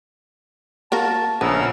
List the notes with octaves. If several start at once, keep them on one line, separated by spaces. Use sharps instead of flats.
A#3 F#4 A#4 A5
A#1 C#3 B3 A#4 B4 G#5 E6